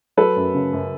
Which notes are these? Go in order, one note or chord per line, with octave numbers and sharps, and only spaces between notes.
F#3 A4 B4
F#2
C#3
F#2